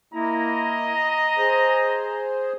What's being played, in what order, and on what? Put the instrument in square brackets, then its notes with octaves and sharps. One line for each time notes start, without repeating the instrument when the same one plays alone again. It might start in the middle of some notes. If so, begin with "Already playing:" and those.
[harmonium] A#3 E4 [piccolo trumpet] D#5 [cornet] A#5
[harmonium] G#4 C5